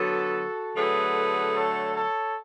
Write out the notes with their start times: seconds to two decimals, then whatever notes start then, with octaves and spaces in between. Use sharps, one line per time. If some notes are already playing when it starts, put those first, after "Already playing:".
Already playing: D3 F#3 B3 F#4 A4
0.76 D3 F#3 A3 G#4 B4
1.55 A4 C#5
1.95 A4 C#5